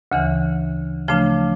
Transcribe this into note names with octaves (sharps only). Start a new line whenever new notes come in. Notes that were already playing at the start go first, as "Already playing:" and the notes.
D2 C#3 E3
C#3 F3 A3 D4